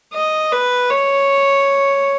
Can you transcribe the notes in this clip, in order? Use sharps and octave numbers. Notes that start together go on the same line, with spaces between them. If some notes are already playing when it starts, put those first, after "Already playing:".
D#5
B4
C#5